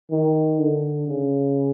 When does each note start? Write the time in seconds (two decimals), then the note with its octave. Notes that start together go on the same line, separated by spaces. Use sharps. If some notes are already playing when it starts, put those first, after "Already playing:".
0.11 D#3
0.59 D3
1.08 C#3